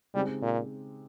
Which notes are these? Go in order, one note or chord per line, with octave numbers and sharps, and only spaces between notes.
C#3 G3 G#3 C4 D#4 G4
A#2